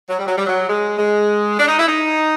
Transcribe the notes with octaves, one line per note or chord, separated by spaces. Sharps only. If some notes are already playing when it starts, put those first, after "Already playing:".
F#3
G3
F#3
G3
F#3
G#3
G#3
D4
D#4
E4
D#4